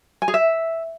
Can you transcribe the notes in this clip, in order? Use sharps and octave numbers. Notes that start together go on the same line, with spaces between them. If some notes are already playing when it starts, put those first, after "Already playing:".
G#5
G#4
E5